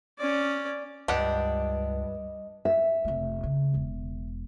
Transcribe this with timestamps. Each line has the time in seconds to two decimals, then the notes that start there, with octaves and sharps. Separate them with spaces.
0.19 C#4 D5
1.08 C#2 G2 D4 G4 D#5 F#5
2.65 E5
3.05 F1 A3
3.43 C#3
3.73 E1 E2